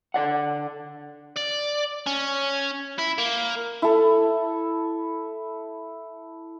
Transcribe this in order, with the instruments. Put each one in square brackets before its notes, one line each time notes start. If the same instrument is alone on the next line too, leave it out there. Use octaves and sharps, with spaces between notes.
[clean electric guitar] D3 D5 F#5
[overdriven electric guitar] D5
C#4
E4
A#3
[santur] E4 A4